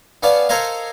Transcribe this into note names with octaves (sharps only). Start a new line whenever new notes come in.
B3 C#4 D5 F5 A5
A4 A#4 C5 C#5 D#5 F5